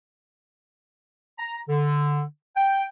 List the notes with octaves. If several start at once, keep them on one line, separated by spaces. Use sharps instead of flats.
A#5
D3
G5